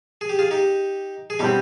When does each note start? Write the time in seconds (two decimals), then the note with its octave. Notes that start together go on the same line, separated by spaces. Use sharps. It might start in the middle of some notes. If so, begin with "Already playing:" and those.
0.21 G#4
0.29 G4
0.39 F4 G#4
0.51 D#4 G4
1.30 G#4
1.39 B2 G3 C4 D#4 G4